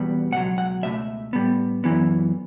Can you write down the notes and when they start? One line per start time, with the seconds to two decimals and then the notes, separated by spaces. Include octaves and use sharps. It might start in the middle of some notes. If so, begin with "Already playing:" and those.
Already playing: E2 B2 G3 B3
0.32 C#2 B2 F#3 F#5
0.58 F#5
0.83 C#2 B2 A3 E5
1.33 A2 G3 B3
1.84 F#2 E3 B3